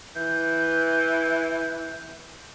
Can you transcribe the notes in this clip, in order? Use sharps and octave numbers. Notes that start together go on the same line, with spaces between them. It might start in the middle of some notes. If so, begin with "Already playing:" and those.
E3 G6